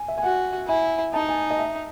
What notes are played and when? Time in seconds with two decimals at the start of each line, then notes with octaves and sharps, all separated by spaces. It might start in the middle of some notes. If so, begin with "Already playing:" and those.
Already playing: G#5
0.08 E5
0.18 G#5
0.23 F#4 F#5
0.68 E4 G#5
1.13 D#4 A5
1.29 G#5
1.51 D#5
1.59 E5